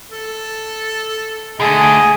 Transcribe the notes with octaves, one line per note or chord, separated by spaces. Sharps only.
A4
D3 A3 G#4 D#5